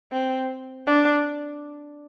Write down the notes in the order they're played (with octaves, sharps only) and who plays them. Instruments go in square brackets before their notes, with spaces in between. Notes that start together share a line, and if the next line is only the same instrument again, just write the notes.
[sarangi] C4
D4